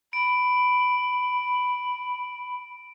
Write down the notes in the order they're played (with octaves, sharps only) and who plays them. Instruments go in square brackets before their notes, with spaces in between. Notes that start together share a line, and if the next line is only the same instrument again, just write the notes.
[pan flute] B5 [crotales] D7